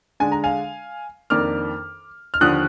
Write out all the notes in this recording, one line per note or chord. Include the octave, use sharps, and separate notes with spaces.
D3 G#3 D4 G#5
A#5
F5 G#5
F2 D#3 A#3 D4 D6 F6
F6
D#2 D3 F3 D#6 F#6